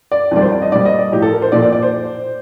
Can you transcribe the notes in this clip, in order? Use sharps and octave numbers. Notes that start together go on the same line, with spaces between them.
D5
F2 D#3 G3 D5
C5
D5
D#5
A#2 G3 D5
D#5
D5
A2 F3 G4
A4
A#4
C5
A#2 F3 D5
D5
D5
C5